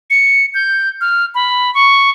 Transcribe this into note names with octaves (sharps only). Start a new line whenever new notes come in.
C#7
G6
F6
B5
C#6